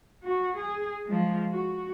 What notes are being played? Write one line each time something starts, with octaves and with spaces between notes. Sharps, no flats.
F#4
G#4
F3 G#3
F#4